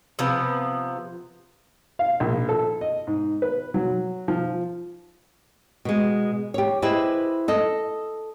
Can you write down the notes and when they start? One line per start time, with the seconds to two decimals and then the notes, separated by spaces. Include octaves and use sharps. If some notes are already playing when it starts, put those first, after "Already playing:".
0.19 C3 F3 B3
1.99 F5
2.20 A#1
2.49 A4
2.81 D#5
3.07 G#2
3.42 B4
3.74 F#3
4.28 F3
5.85 B2 G#3
6.54 G4 C#5
6.82 E4 G4 G#4 B4 C5 D#5
7.48 A4 D#5